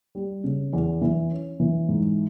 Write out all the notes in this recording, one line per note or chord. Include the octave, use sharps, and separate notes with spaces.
G3
C#3
E2
E3
C#4
E3
G#2